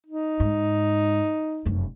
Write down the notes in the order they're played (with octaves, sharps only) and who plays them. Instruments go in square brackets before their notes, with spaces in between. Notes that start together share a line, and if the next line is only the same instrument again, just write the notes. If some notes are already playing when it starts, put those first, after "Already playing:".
[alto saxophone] D#4
[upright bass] G#2
F1 F#2